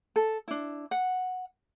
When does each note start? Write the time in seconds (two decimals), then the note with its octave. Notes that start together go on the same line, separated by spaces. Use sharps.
0.16 A4
0.48 D4 E4
0.91 F#5